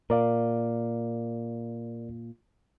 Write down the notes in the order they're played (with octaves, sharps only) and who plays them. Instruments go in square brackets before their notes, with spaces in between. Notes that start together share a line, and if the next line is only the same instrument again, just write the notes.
[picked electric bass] A#2 [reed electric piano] A#4 D5 F5